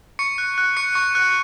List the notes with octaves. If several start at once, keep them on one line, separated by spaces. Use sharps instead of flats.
C#6 C#7
F#6
F#6
C#6 C#7
C#6
F#6